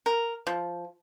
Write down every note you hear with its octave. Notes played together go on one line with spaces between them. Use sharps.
A#4
F3